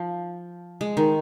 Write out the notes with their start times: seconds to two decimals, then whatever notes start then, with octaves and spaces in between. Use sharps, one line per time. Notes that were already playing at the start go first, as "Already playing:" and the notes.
Already playing: F3
0.81 G#3
0.97 D#3